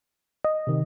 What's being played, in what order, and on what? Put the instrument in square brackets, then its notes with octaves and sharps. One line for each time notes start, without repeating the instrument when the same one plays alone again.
[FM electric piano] D#5
[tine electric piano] C3 D#3